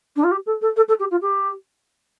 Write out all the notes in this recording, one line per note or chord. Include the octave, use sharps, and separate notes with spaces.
D4
F4
G4
A4
A4
A4
A4
G4
F4
G4